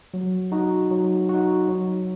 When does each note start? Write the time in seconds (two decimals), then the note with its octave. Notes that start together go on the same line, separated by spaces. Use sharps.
0.14 F#3
0.52 D#4 F#4
0.91 F#3
1.29 D#4 F#4
1.68 F#3